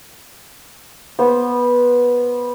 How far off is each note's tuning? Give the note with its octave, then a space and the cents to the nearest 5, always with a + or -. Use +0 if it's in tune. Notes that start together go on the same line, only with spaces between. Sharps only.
B3 -15 C5 +0